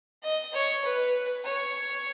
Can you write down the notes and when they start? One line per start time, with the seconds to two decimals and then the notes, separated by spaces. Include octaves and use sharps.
0.23 D#5
0.54 C#5
0.85 B4
1.45 C#5